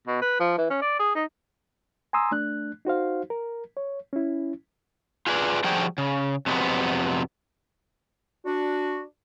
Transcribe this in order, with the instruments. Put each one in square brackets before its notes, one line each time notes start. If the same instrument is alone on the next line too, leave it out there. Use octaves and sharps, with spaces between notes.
[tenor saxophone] B2
B4
F3
E3
C#4
D5
G#4
D#4
[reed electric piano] G#5 A#5 C6 D#6 E6
A3 D4 F#6
D#4 F#4 C5 F5
A#4
C#5
C#4 E4
[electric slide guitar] F4 G#4 B4 D5
D3 F3 G3 F#4 G#4 G5
C#3
F2 C3 F#3 G#3 B3
[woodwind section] D4 F#4